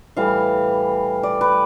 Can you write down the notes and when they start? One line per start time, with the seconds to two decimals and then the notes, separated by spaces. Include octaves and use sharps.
0.16 A2 E3 G3 F5
1.23 D5
1.41 B4